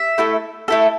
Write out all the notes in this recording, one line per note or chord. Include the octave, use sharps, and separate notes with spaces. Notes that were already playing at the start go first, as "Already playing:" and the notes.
Already playing: E5
A3 E4 A4
A3 E4 A4